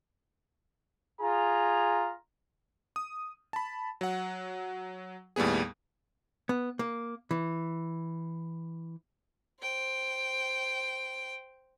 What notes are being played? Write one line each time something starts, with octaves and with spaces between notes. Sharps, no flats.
F4 G#4 A#5
D#6
A5 B5
F#3 F#5
D#2 A2 G3 B3 G#4
B3
A#3
E3
C5 G5